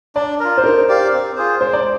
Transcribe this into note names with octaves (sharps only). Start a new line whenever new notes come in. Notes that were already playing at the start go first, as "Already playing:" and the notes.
D4 D5
F4 A#4
C5
D#4 A#4
G4 D5 F5
C4
F4 G#4 C5
G#3 C5
D5